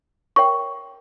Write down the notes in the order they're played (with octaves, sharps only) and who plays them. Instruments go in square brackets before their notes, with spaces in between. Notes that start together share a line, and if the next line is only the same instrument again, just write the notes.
[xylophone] A#4 C#5 E5 G5 C#6